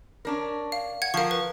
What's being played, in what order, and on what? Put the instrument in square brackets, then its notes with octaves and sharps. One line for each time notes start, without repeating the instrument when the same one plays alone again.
[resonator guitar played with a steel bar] C#4 D4 A#4
[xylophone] F5
F#5 G#6
[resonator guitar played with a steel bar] F3 A#4 [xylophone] F5 C#6
[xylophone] B4